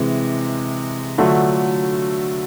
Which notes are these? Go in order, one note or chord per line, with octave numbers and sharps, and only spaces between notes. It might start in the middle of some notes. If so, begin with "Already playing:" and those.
Already playing: C3 E3 G#3
D3 F#3 A3 D4 F4